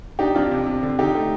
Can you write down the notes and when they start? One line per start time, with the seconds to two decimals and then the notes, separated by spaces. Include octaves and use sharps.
0.19 D4 D#4 G4
0.35 F2 D4 F4
0.51 C3
0.66 C3
0.83 D3
0.99 D3 D#4 G4
1.15 A3